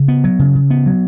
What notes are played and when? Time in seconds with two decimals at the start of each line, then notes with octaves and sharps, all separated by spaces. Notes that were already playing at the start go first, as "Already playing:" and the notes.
Already playing: C#3
0.08 B3
0.24 F#3
0.39 C#3
0.55 C#3
0.70 B3
0.86 F#3